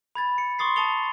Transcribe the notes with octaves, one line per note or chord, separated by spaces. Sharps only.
B5 G#6 A6
C#7
C6 C#6 D#6 A6 C7
A5 D#6 A6 C#7 F7 G7